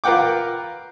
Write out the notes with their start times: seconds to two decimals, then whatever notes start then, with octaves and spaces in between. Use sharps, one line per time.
0.04 F4 A#4 B4 F#5 G5 D6